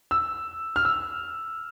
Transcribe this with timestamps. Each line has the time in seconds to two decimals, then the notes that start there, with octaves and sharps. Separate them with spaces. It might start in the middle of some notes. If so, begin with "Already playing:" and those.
0.11 E6
0.76 F6
0.85 E6